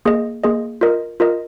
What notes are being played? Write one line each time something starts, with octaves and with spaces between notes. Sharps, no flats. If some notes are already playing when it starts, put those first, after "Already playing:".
A#3 G#4 D#5
A#3 G#4 D#5
F4 A#4 D#5
F4 A#4 D#5